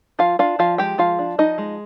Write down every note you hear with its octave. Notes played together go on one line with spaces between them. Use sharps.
F3 F4 F5
D4 F4 F5
F3 F4 F5
G#3 G4 G5
F3 F4 F5
D4
F3 D#4 D#5
G#3